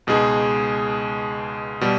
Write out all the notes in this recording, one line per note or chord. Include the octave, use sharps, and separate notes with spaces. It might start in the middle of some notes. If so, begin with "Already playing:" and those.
C#2 B2 G#3 D#4 G#4
B2 G3